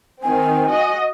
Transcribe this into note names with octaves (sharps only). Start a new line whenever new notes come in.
D#3 C4 G#5
F#4 D#5